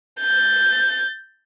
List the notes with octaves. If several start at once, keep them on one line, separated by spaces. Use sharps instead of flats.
G6 A6